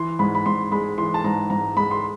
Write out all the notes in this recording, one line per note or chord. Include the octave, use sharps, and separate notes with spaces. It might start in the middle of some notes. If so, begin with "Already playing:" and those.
Already playing: E3 C6
G#2 B5
B5
G#2 C6
G#3 B5
E3 C6
A5
G#2 A#5
G#2 A#5
G#3 B5
C6